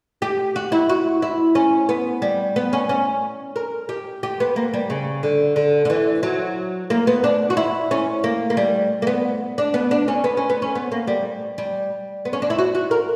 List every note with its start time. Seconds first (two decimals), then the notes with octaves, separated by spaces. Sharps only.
0.22 G4
0.56 F#4
0.72 E4
0.89 F#4
1.22 E4
1.55 C#4
1.89 B3
2.22 G3
2.56 B3
2.73 C#4
2.89 C#4
3.56 A#4
3.89 G4
4.23 G4
4.40 B3
4.56 A#3
4.73 G3
4.90 C#3
5.23 D3
5.56 D3
5.85 D3
5.90 E3
6.23 F#3
6.90 A#3
7.07 B3
7.24 D4
7.50 F#4
7.57 E4
7.91 C#4
8.24 A#3
8.50 A#3
8.57 G3
9.02 A#3
9.07 B3
9.58 D4
9.74 B3
9.91 D4
10.08 C#4
10.24 B3
10.37 C#4
10.50 B3
10.62 C#4
10.75 B3
10.92 A#3
11.07 G3
11.58 G3
12.25 B3
12.33 C#4
12.42 D4
12.50 E4
12.58 F#4
12.75 F#4
12.91 A#4